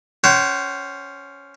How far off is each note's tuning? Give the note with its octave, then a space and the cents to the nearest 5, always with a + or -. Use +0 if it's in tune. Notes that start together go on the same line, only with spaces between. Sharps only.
C#4 +5 C5 +0 F#5 +40